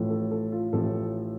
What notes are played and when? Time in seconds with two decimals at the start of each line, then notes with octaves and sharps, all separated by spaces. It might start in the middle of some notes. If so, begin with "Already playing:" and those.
Already playing: A1 A2 F3 A3
0.10 A4
0.31 A4
0.52 F4
0.73 A1 A2 F3 A3 A4